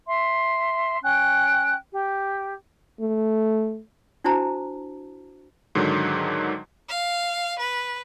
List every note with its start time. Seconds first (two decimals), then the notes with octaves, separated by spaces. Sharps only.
0.06 E5 C6
1.02 C#4 G5 F#6
1.92 G4
3.01 A3
4.24 D4 E4 F#4 C5 A5 A#5
5.75 G#2 D3 D#3 F#3
6.89 F5
7.59 B4